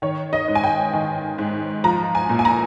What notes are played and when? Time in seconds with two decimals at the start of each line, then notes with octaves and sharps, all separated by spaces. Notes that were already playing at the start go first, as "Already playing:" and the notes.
0.02 D#3 C#5
0.33 D#5
0.48 G#2
0.55 G#5
0.64 G5
0.93 D#3
1.38 G#2
1.84 F3 A#5
2.15 G#5
2.29 A#2
2.39 G#5
2.45 A#5